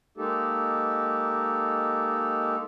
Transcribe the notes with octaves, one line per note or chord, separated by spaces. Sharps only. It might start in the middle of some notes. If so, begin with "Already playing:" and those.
G#3 A#3 D#4 G4 A4